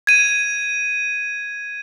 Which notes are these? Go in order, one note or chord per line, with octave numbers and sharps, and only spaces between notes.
G#6 D#7